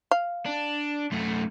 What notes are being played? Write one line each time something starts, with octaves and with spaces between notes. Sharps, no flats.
F5
D4
F#2 A3